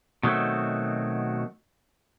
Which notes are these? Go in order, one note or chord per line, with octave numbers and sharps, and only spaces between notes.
B2 D#3 F#3 G3 A3 C4